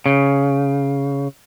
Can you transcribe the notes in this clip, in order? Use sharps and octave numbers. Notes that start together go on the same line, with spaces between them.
C#3